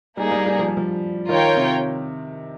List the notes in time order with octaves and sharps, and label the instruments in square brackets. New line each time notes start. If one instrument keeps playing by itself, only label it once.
[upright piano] G3 [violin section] A#3 D#4 G#4
[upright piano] G3
G3
F3
G3
F3
[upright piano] D#3 [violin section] F4 A#4 C#5 G5
[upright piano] C3